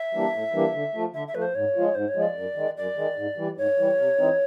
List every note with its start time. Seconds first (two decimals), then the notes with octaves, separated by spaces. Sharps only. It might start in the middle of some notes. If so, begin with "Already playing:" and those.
Already playing: E5
0.13 E3 G3 A#3 D4
0.33 A2
0.53 E3 G3 A#3 D4
0.74 D3
0.95 F3 A3
1.14 D3 E5
1.28 E5
1.35 F3 A3 B4
1.42 C5
1.55 G#2 C#5
1.75 F3 G#3
1.95 G#2 C5
2.08 C#5
2.16 F3 G#3
2.22 D5
2.35 F#2
2.56 D#3 G#3
2.77 F#2 D5
2.97 D#3 G#3
3.17 G#2
3.37 E3 G3
3.57 G#2 C#5
3.78 E3 G3
3.98 C3
4.19 E3 G#3 C4 D#4